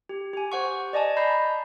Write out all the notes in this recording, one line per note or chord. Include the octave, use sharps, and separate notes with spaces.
G4
G4 G#5
C5 F#5 C#6
D5 D#5 G#5 A5
D#5 A#5 B5 G6 C7